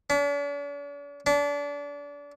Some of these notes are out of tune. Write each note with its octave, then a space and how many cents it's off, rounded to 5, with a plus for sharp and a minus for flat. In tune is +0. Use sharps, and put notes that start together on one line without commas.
D4 -45
D4 -30